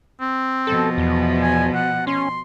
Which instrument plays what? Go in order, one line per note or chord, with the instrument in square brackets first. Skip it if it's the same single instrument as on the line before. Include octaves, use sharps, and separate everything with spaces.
[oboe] C4
[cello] B2 F3 [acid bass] A4
[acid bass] E2
[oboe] G#5
F#5
[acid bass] C#4 [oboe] C6